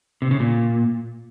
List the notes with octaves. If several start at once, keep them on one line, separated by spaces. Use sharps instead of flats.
C3
C#3
A#2